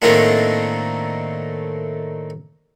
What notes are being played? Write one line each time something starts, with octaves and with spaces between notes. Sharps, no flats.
A2 D#3 A3 A#3 C4 D4